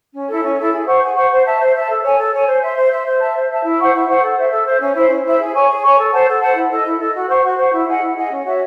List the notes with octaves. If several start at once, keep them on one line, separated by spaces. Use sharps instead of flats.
C#4
E4 A4
C#4
E4 A4
G#4
C5 F#5 C#6
G#4
C5 F#5 C#6
C5
E5 A5
C5
E5 A5
A4
C#5 G#5
A4
C#5 G#5
C5
E5 C6
C5
E5 C6
C5
E5 A5
C5
E5 A5
E4
C5 F#5 C#6
E4
C5 F#5 C#6
A4
C5 E5
A4
C5 E5
C#4
E4 C5 E5
C#4
E4 C5 E5
G#4
C#5 G#5 C#6
G#4
C#5 G#5 C#6
A4
C5 F#5 A5
A4
C5 F#5 A5
E4
A4 D#5
E4
A4 D#5
F#4
C5 F#5 C#6
F#4
C5 F#5 C#6
E4
G#4 D#5 F#5
E4
G#4 D#5 F#5
C#4
F#4 C#5 E5